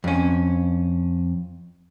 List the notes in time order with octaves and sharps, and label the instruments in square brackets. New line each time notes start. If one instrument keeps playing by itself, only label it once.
[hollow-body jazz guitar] F2 C#4